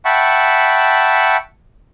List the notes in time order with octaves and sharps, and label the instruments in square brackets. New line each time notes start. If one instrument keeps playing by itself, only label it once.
[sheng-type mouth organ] E5 F#5 G5 A5 B5 C#6